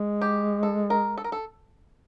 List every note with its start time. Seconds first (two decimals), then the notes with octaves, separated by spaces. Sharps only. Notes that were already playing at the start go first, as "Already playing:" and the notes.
Already playing: G#3
0.21 G4
0.63 A4
0.90 A#4
1.17 A4
1.24 A#4
1.32 A4